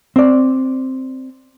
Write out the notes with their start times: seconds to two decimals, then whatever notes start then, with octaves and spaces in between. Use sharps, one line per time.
0.16 C4 D5